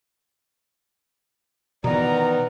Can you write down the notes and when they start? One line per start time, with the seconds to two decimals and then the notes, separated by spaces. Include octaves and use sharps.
1.84 B2 D#3 E3 B3 D5 A#5